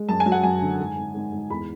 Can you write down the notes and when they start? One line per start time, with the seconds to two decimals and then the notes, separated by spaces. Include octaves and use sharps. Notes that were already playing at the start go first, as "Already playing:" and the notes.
Already playing: G#3
0.09 F#2 A5
0.20 G#5
0.26 F#3
0.32 F#5
0.43 F#2 G#5
0.62 D3
0.80 G#2
0.97 G#2
1.15 G#2
1.32 G#2
1.50 E2 B5